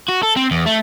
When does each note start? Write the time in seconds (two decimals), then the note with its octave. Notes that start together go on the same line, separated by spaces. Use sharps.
0.09 F#4
0.23 A4
0.37 C4
0.51 E2
0.66 A3